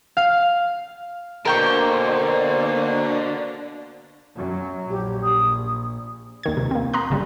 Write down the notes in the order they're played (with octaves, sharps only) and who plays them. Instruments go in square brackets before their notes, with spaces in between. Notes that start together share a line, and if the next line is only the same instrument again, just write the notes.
[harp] F5
[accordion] B2 A#3 [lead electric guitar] D3 [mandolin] A#4 G5 C#6 [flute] C5
[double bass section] F#2 F#3
[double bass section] A#1 [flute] G4
[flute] D#6
[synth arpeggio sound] D#2 D#3 G#6
C#2 C3
A#3 C4
A#5 C6 D#6 F#6
G1 C#3 G3